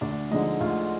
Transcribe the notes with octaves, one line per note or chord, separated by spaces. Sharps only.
D2 D4 D5
D3 F3 G#3 D#4 D#5
D2 F4 F5